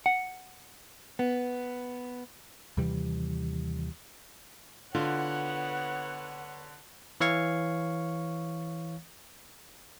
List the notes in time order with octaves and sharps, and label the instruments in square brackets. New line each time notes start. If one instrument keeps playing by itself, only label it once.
[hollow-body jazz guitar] F#5
B3
[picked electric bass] D#2 C3 E3 G3
[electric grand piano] D3 [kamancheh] B3 C#5 [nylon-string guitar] F4 [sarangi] F#5
[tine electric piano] E3 C#5 F5 C#6